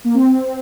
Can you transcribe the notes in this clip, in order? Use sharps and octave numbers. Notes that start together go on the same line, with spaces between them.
A#3
C4